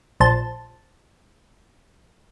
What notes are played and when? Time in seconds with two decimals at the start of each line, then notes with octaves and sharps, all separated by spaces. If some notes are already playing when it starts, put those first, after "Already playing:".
0.20 A#1 C5 A5